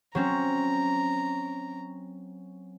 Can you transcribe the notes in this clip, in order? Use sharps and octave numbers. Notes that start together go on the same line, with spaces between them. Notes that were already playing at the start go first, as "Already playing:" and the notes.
F#3 C4 C#4 A#5